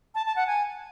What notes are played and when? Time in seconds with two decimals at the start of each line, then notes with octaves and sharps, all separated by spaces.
0.15 A5
0.26 A5
0.36 F#5
0.47 G#5